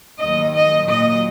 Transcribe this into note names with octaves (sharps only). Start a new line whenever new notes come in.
D#2 D#3 F#3 D#5
D#5
A#2 F#3 D#5